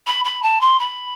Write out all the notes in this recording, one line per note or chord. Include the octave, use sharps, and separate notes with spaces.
B5
B5
A5
C6
B5